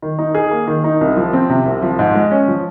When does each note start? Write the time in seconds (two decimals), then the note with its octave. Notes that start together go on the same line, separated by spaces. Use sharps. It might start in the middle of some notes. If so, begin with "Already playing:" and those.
0.02 D#3
0.19 D#4
0.35 G#4
0.51 A#3
0.67 D#3
0.84 D#4
1.01 C2
1.17 F3
1.33 C4
1.50 C3
1.66 C2
1.82 F3
1.99 G#2
2.15 G#3
2.31 C#4
2.48 F3